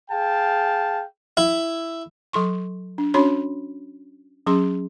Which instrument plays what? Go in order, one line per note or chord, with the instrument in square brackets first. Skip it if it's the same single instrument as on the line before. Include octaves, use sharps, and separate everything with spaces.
[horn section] G#4 F5 G5 A5
[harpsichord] E4
[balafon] F#3 A4 C6 C#6
D4
C#4 D4 F#4 C#5 B5 C6
F#3 C#4 G#4 C6